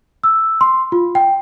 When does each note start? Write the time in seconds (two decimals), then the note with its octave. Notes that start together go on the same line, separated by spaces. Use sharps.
0.24 E6
0.61 C6
0.92 F4
1.15 G5